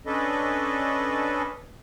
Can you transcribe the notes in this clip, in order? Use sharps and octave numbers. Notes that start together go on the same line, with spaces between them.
C#4 D4 A4 B4 D#5